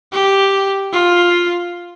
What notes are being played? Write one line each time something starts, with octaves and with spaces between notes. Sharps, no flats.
G4
F4